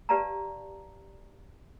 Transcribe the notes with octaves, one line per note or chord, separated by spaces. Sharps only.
G4 B4 D5 F5 A5 A#5